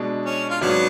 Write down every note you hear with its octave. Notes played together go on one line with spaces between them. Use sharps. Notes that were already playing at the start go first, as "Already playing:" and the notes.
Already playing: B2 G#3 D4
C#4
F4
G#1 G#2 F#3 B3 C#4 D4 F#4